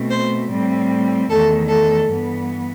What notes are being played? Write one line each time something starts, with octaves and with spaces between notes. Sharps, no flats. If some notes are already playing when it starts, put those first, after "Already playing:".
Already playing: B2 A3 C4
C5
A2 G3 C4
E2 D#3 A3 A4
A4
G2 E3 B3